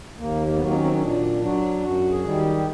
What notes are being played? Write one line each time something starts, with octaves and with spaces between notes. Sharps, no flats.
D#2 A#3
A#3
B3
D#3 F#3 A#3
C4
C#4
C4
C#4
A#2 D4
F#3 D4
F#2 F#4
G#4
D#3 G3
G4